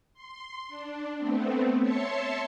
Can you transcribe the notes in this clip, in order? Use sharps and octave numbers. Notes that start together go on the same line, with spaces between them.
C6
D4
A3 B3 C4
C#5 E5 A5 C6 C#6